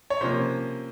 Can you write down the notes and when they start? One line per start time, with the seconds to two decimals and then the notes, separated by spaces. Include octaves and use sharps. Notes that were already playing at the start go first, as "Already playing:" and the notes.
0.10 C#5
0.21 C3 F3 A#3 C#4 C5